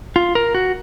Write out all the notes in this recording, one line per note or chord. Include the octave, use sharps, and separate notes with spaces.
F4
A#4
F#4